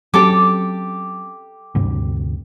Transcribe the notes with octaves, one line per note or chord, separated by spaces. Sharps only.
F#3 C4 C#4 G4 A4 D6
D2 G2 C3